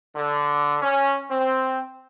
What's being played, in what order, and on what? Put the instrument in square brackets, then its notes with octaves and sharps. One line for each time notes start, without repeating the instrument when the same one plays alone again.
[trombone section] D3
C#4
C4